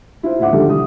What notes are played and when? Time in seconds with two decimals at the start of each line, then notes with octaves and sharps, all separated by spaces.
0.23 E4 F4 C5
0.39 D2 A2 E5 F#5 D6
0.53 D3 D#3 F3 G3 G4 A4
0.69 C2 G3 D#6